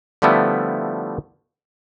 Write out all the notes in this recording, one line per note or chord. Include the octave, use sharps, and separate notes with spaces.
D3 F3 G3 A3 B3 E4